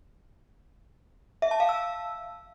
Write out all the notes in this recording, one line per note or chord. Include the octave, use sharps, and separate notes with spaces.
E5
A5
F5
E6